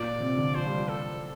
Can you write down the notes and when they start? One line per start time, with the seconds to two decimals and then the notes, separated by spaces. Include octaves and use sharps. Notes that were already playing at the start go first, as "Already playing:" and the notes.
Already playing: A#2 D5
0.20 C3
0.37 D3
0.55 F3 C5
0.67 G3
0.77 F3
0.89 A4